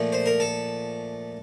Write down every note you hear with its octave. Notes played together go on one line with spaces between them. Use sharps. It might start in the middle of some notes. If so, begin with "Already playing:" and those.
Already playing: A#2 F3 A3
C5
A#4
A4